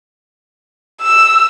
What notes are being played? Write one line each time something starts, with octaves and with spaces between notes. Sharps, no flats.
E6